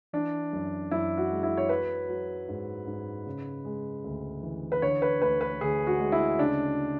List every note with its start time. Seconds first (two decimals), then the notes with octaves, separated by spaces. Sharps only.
0.13 E3 D4
0.53 F#2
0.91 F#2 E4
1.17 F#4
1.31 G#3
1.43 E4
1.57 C#5
1.69 F#3 B4
2.09 F#3
2.48 G#2
2.87 G#2
3.26 C#3
3.65 G#3
4.04 D2
4.43 E3
4.72 B4
4.82 D3 C#5
5.02 B4
5.21 D2 B4
5.41 B4
5.61 D2 G#4
5.87 F#4
5.99 G#3
6.12 E4
6.39 C#3 D4